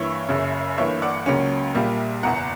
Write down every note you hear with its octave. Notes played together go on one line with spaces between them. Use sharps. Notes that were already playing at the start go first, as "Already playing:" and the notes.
Already playing: G2 E3 A#3 E4 C#5 E5
F#1 F#2 C#3
G1 G2 E3 A#3 C#5 E5
D5 F#5
C#2 C#3 F#3 A#3 C#4
A#1 A#2 G3 A#3
F#1 E2 B2 F#5 A#5